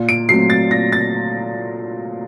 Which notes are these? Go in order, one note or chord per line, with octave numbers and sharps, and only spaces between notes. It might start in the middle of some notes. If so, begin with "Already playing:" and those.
Already playing: A#2
D7
F#3 A3 C4 C7
A6
A#2 A#6
A6